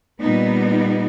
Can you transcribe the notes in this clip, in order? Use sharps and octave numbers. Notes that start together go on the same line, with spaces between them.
A#2 G3 B3 D#4